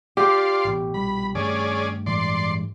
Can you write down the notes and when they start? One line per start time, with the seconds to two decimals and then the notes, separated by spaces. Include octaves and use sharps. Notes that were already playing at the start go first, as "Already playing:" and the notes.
0.17 F4 G4 D5 C6
0.65 A1 B2
0.94 A#1 B2 G3 B5
1.35 G2 D#3 A3 C#4 G#4 D5
2.06 A2 E3 G#3 D5 C6